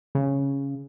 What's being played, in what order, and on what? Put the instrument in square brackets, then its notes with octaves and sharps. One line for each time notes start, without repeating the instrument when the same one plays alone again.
[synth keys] C#3